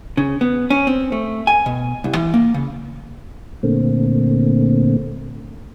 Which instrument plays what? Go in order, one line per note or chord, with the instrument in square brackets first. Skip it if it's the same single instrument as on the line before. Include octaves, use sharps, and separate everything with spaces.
[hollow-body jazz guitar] C#3
B3
C#4
C4
A3
G#5
B2
C2
E3
A#3
C#3
[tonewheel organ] A#2 D3 A3 A#3 C4